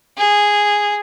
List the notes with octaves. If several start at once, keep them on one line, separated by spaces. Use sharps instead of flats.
G#4